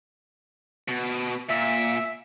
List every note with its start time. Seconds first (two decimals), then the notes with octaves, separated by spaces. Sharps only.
0.88 B2
1.49 A#2 E5